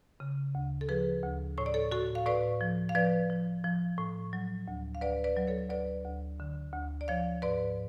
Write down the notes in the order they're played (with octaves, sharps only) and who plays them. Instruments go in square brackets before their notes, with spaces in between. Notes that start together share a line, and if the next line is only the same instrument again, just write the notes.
[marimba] C#3
D2
A4
F3 G#4 B4
D2
A2 C#5
D5
A4 C#5
A2 F#4 A4
F5
A2 B4 D5
F3
F5
F3 B4 D5
F3
F3
A2
F#3
D2
F5
D2 B4 D5
B4 D5
F#3
A4 C#5
D2 B4 D5
D2
D3
D2
D5
F3 C#5 F5
G#2 B4 D5